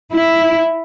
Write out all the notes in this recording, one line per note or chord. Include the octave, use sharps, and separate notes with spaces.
E4